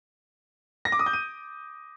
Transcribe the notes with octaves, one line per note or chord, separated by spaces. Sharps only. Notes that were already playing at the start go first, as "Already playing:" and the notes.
A#6
D6
D#6
G6
D#7